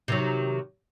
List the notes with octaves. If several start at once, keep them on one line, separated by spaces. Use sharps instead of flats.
C3 D#3 F#3